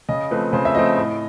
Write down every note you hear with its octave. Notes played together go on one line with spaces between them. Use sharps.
C#3 D#5
F3 A3 C4 B4
C#3 C5
E5
F3 A3 C4 D#5
A2